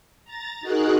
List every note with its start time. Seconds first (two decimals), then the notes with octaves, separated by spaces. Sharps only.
0.25 A#5 A6
0.61 D#4 F#4 G#4 A#4 F#6